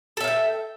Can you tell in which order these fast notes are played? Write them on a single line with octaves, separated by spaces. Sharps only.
A4 E5 F5 G5